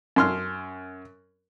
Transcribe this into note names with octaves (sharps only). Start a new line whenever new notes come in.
F#2 C6 F6